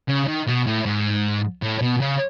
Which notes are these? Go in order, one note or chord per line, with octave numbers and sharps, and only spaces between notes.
C#3
D#3
B2
A2
G#2
A2
B2
C#3